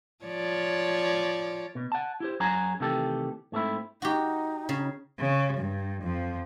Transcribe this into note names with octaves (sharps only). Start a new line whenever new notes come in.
F3 C#5 D5
B2
F#5 A5
E4 G4 C5
F#2 F#4 G#4 A#5
C3 D#3 E3 A3 G4 A4
G#2 A3 C4 E4
D#4 F#4 G4
C#3
C#3
G2
F2 F3